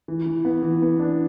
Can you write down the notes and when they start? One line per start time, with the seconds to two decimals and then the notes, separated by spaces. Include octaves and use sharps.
0.08 E3
0.26 E3
0.45 B3
0.63 E3
0.82 B3
0.99 D4